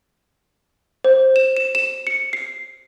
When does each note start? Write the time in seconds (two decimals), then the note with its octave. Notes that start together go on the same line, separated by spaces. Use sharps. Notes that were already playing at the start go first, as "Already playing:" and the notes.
1.04 C5
1.36 E7
1.57 E7
1.75 E7
2.07 C#7
2.33 C7